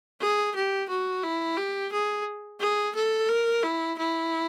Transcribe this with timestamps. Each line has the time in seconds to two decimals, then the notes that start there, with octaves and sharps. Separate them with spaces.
0.21 G#4
0.56 G4
0.89 F#4
1.23 E4
1.57 G4
1.92 G#4
2.60 G#4
2.95 A4
3.29 A#4
3.63 E4
3.98 E4